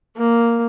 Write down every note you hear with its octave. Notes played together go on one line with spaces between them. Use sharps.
A#3